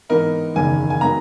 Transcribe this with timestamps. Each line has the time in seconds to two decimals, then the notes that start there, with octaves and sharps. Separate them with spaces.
0.09 G#2 E3 B3 D#4 A#4
0.55 F#1 E2 D#3 G#5
0.90 G#5
1.01 D#3 F#3 B3 A#5